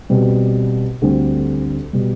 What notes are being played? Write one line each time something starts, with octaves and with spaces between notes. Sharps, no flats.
B2 G3 C4
D2 D3 G3 C4
B2 G3